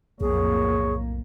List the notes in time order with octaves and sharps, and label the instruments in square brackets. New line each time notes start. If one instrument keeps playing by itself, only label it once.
[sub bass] B1 [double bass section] F2 A2 A#3 [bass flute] G#4 [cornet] C#5